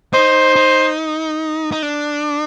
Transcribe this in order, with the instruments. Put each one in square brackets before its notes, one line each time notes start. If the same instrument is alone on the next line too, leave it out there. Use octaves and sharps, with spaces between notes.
[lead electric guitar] D#4 [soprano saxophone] C5
[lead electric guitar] D#4
D#4
D4